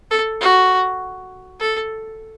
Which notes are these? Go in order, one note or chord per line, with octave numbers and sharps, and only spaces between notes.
A4
F#4
A4